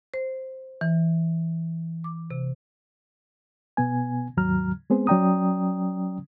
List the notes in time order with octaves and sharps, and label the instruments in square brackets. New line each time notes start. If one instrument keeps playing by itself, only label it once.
[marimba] C5
E3
D6
C3
[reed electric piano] B2 B3 G#5
D#2 G#2 F#3 A#5 F6
G#3 B3 C4 G#4 C5
F#3 C#4 D5 G5 A#5 D#6